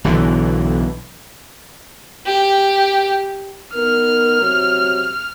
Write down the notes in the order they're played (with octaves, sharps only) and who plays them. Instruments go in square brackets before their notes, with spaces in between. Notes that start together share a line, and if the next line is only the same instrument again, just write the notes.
[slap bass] B1 B2 D3 E3
[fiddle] G4
[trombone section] B3 D#4 A#4 [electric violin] F6
[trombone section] C3 F#3